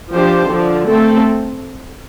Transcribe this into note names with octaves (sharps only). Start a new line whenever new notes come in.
F3 D4 G4 C5
D3 F3 D4
A3 C4 A4